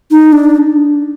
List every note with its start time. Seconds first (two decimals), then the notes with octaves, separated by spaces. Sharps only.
0.11 D#4
0.33 D4